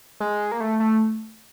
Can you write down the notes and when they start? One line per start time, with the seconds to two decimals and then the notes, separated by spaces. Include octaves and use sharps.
0.20 G#3
0.52 A#3
0.60 A3
0.80 A3